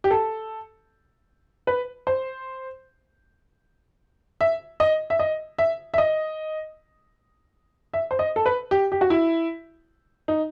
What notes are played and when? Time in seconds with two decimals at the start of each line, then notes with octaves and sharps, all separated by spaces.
0.04 G4
0.11 A4
1.67 B4
2.07 C5
4.41 E5
4.80 D#5
5.10 E5
5.19 D#5
5.58 E5
5.94 E5
5.98 D#5
7.94 E5
8.11 C5
8.19 D#5
8.36 A4
8.46 B4
8.71 G4
8.92 G4
9.01 F#4
9.10 E4
10.28 D#4